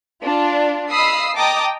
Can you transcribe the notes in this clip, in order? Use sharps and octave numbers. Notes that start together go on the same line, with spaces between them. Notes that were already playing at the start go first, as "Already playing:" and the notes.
D4 F4
D#5 F5 B5 D#6 E6 C7
D#5 G5 A5 A#5 D6 D#6